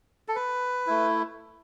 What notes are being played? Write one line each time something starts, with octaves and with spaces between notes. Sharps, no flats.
A4
B4
A3 E4